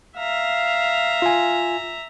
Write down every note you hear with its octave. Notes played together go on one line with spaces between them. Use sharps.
E5 F5 A#5
F4 G#5